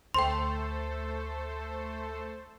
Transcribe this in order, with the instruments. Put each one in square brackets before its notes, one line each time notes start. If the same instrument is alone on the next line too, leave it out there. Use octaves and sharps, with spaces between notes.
[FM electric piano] D2 [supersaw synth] A3 A4 C5 [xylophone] G5 C6